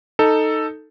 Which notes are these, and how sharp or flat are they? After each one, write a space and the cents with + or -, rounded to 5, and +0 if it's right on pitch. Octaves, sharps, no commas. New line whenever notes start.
D#4 +0 A4 +5